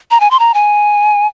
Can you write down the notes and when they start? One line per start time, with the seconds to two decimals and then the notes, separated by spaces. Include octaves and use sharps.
0.11 A#5
0.20 G#5
0.31 C6
0.39 A#5
0.54 G#5